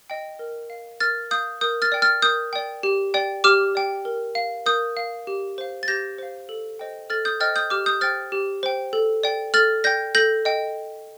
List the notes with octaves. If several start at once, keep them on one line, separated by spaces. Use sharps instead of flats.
D#5 G5
A#4
F5
A#4 F6 A6
F5 D#6 G6
A#4 D#6 G6
F6 A6
D5 G5
F6 A6
A#4 D#6 G6
D5 G5
G4
D5 G5
G4 D6 F6
D5 G5
A#4
F5
A#4 D#6 G6
F5
G4
C5 F5
A6
G4 G6 A#6
C5 F5
A4
C5 D#5 G5
A4 F6 A6
D#6 G6
C5 D#5 G5 F6 A6
D#6 G6
G4 D6 F6
D#6 G6
C5 G5 F6 A6
G4
C5 G5
A4
D5 G5
A4 F6 A6
D5 G5 G6 A#6
A4 G6 A#6
D#5 G5